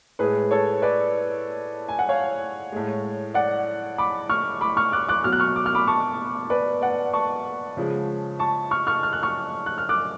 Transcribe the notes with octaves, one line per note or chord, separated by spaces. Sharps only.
A2 G#3 G#4 B4
A4 C#5
B4 D5
G#5
F#5
C#5 F5
A2 G#3
D5 F#5
B5 D6
C#6 F6
B5 D6
C#6 F6
D6 F#6
D6 F#6
B2 F#3 F6
F#6
C#6 F6
D6
F6
B5 D6
A5 C#6
B4 D5
D5 F#5
A5 C#6
C#3 F3 G#3
A5 C#6
C#6 F6
C#6 F6
F6
F#6
C#6 F6
F#6
F6
D6 F#6